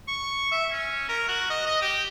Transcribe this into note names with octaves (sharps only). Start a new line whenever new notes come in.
C#6
E5
C#4
A#4
F#4
D#5
D#5
G4